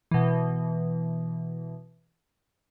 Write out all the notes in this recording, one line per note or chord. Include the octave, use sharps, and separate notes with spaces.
B2 E3